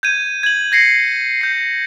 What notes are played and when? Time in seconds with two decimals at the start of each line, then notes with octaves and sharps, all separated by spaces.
0.03 G6 G#6 D#7
0.43 G#6 F#7
0.72 G#6 A#6 C7 C#7
1.41 G6 C7